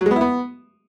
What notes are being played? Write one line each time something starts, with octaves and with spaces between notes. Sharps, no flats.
F#3
G#3
B3
E4
B3